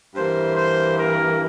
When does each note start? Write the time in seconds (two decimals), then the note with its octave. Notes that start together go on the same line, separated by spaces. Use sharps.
0.14 G2 E3 A#3 C5
0.56 C5
0.97 A#4